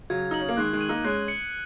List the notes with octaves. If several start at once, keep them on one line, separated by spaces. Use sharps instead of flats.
C#3 F#3 G#6
D#4 F#7
C#4
A#3
D#3 G#3 F#6
D#3 G#3
D#7 F#7
A#3 D#4
G#3 C#4 F#6
C#7 F#7